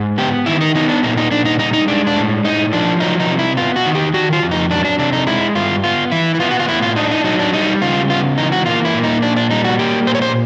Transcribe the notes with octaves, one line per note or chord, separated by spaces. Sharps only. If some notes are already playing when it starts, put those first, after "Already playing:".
Already playing: G#2
B3 G4
D#3 E4
D#4
B3 D#4
D4
A#2 D#4
D#4
A#2 D4
D#4
G3 D#4
D#4
G#3 D4
D4
A2
A2 D#4
F3 D4
F#3 D#4
D#4
C3
E4
B3 F4
F#4
D#3
G4
D#3 F#4
F4
F2
D#4
F#3 D4
D4
C3 D4
D#4
G#3 E4
G2 F4
B3 F4
E3 E4
E4
B3 F4
F#4
F4
A2 E4
F4
D4 D#4
D#4
F#3 D#4
D4
G3 D#4
C#3 F4
B3 F4
E3 D#4
F#4
A#3 F4
E4
A#2
D#4
A#2 D4
D4
G3 D#4
F#4
A#3 G4
A#2 C5
C#5
C5